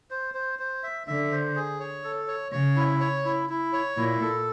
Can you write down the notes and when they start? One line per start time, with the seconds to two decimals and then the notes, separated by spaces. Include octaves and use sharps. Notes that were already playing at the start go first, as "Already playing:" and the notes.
0.11 C5
0.34 C5
0.59 C5
0.83 E5
1.07 D3 E5
1.32 C5
1.56 G#4
1.80 C#5
2.04 A4
2.28 C#5
2.52 C#3 C#5
2.76 E4
3.00 C#5
3.25 E4
3.49 E4
3.73 C#5
3.97 A#2 E4
4.22 A4